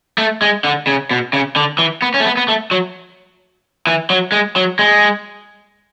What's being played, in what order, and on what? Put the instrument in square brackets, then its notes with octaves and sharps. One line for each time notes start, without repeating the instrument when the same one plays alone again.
[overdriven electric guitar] A3
G#3
D3
C#3
B2
C#3
D3
E3
B3
C#4
A3
B3
B3
A3
F#3
E3
F#3
G#3
F#3
G#3